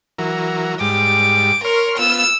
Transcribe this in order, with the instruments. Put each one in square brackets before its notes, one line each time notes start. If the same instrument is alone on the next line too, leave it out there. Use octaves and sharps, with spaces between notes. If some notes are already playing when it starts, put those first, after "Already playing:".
[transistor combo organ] E3 F#3 A#4
[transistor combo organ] G#2 G3 [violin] D6
[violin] A#4 [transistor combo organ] C#5 C6 F6
[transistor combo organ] B3 F4 [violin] E6